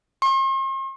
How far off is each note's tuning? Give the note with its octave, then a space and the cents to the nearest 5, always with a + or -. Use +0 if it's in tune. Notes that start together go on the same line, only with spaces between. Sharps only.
C6 +45